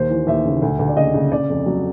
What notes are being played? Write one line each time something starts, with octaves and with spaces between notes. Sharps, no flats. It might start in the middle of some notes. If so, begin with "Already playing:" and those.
Already playing: D#2 C5
E3
D#2 E5
C#3
D2
D2
D5
C#3 D#5
C#3
C#3 D5
F2
F#3